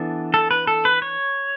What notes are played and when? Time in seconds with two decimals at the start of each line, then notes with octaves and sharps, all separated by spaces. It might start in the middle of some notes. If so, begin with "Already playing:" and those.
Already playing: E3 B3 D4 A4
0.34 A4
0.51 B4
0.67 A4
0.85 B4
1.02 C#5